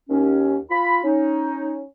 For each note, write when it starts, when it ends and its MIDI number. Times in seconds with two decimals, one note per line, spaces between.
0.10 0.57 39
0.10 0.57 61
0.70 1.00 65
0.70 1.00 83
1.04 1.82 61
1.04 1.82 63